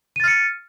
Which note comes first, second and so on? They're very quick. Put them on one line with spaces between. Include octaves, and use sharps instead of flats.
D#7 A6 F6 C#7